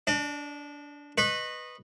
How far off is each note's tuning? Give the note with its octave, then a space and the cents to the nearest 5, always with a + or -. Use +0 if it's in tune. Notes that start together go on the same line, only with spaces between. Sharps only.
D4 -20 D5 +45
B4 +0 D#5 -15 C#6 -35